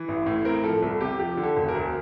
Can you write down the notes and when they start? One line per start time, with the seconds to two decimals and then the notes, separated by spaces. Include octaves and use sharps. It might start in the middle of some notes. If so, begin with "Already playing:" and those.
Already playing: E3
0.08 A1
0.26 A2
0.45 C4 A#4
0.64 F3 A4
0.82 C2 A4
1.00 C3 G4
1.19 F3 G4
1.37 D3
1.44 A4
1.57 E1
1.68 A#4
1.75 D2